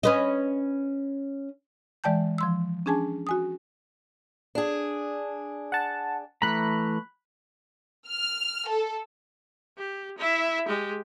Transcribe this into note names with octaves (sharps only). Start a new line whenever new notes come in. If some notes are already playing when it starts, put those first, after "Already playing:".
C#4 B4 D#5
E3 G#3 D5 G5 A5 G6
F3 C6 E6
C#4 D4 G#4 G#5 A5
F#4 G#5 D#6
D4 G#4
F#5 A5
E3 A3 A#5 B5 F#6
F6
A4
G4
E4 E5
G#3 G4